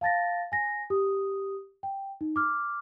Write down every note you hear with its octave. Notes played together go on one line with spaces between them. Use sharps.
F5 A5 A6 A#6
G#5 A#6
G4 D#6
G5
D#4
D6 F6